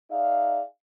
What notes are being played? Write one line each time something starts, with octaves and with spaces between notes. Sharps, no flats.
D#4 G#4 D5 E5 F5